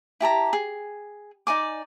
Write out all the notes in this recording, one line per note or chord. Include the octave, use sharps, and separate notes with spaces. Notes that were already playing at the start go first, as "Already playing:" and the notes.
E4 G4 A5 A#5
G#4
D#4 D5 G#5 D6